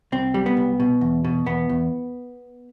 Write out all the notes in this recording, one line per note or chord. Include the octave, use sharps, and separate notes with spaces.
C2 C4
G3
B3
C2
B2
E2
B2
E2 B3
E2